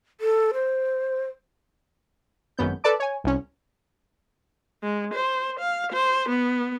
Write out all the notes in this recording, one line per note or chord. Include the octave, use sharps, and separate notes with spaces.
A4
C5
G#1 F#2 B3 G6
A4 B4 D5 A5 D6
C#5 G#5
C2 C#4
G#3
C5
F5
C5
B3